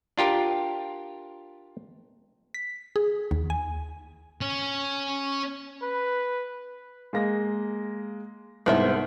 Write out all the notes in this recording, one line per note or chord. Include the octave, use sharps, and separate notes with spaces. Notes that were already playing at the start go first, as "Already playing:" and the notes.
D4 F4 G4 A#4
B6
G#4
D#2
G#5
C#4
B4
G#3 A#3 A#6
C2 G#2 B3 A#4 C5 E5